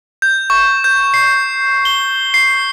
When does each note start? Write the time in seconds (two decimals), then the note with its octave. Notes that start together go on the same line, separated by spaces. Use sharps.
0.22 G6
0.50 C#6
0.84 G6
1.14 C7
1.85 G7
2.34 C7